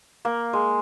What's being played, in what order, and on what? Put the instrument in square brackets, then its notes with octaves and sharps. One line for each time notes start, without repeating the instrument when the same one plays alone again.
[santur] A#3
G#3